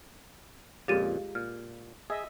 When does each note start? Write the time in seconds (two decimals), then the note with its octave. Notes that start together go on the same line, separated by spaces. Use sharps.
0.88 F2 A#2 C#3 G#3 F4 G4 A6 D#7
1.35 A#2 F6
2.10 G#4 D#5 E5